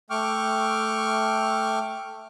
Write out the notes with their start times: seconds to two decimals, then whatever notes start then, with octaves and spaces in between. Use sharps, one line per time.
0.10 A3 G5 C#6 D6 F6